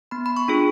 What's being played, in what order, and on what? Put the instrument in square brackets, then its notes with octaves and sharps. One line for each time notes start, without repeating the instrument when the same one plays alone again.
[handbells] B3 B5
B5
C#6
D4 F4 G#4